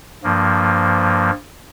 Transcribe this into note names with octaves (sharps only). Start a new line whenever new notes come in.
G2 F3 A#3